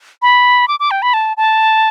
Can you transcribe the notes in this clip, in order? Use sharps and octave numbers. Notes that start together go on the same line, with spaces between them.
B5
D6
D6
G5
B5
A5
A5